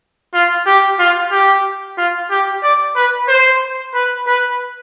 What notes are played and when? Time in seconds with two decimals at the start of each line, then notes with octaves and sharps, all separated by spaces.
0.34 F4
0.66 G4
0.99 F4
1.32 G4
1.98 F4
2.30 G4
2.63 D5
2.96 B4
3.28 C5
3.94 B4
4.27 B4